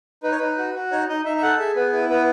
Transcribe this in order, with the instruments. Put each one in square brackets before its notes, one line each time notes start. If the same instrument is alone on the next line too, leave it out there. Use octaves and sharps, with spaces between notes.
[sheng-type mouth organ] D#4 B4
C#5
D#4 B4
F#4
F#4
D#4 C#5
D#4 D#5
D#4 E5
E5
A4 F#5
G#4 E5
B3 B4
E4 B4
B3 B4